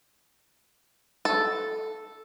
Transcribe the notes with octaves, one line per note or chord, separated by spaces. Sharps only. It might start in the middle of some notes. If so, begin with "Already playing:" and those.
A4